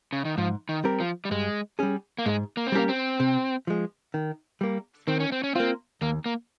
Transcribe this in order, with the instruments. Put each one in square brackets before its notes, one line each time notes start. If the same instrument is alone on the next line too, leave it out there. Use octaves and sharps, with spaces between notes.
[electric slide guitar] C#3
D#3
[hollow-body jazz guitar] G#2 [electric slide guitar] F3
[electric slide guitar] D#3
[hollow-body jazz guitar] G3 C4 G4 A#4
[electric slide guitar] F3
G3
[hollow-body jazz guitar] G2 [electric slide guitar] G#3
[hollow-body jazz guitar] G3 C#4 G#4
[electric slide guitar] A#3
[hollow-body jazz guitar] G#2 [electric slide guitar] G#3
[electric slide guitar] A#3
C4
[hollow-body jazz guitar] G3 C#4 G4 A#4 [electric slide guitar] A#3
[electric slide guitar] C4
[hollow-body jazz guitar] C3
F3 G#3
D#3
G3 A#3
[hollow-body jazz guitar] D#3 [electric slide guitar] C4
[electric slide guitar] C#4
C4
C#4
[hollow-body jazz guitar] A#3 F4 [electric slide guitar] C4
[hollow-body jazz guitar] D#2 [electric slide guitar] A#3
[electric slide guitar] A#3